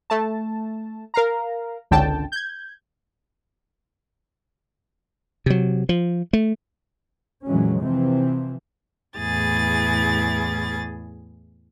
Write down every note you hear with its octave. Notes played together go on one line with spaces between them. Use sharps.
A3 A5
A#4 F5 A#5
G#1 C#2 D3 G5 A5
G6 G#6
C3 F#3
F3
A3
F2 A#2 E3 F#3 G#3 C#4
C3 E3 F3 C4
E2 A2 G#4 A6